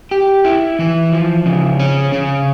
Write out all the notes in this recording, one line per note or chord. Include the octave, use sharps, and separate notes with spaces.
G4
E4
E3
F3
C#3
C#4
C#3